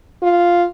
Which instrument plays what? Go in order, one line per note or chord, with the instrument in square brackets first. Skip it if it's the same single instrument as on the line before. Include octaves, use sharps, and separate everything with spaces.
[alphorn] F4